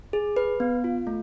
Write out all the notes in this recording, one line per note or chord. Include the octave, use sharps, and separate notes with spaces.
G#4
B4
B3
F4
A3